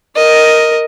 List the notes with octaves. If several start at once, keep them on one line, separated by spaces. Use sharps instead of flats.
A#4 D#5